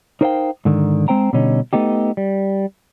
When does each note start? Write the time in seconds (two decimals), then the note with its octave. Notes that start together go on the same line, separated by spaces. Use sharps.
0.21 D#4 A#4 C5 E5 F5 G5
0.65 G#2 D3 D#3
1.08 G#3 C4 C5 G5 A#5
1.33 B2 D3 G3 C#4 D#4
1.73 A3 B3 D#4 G4
2.17 G3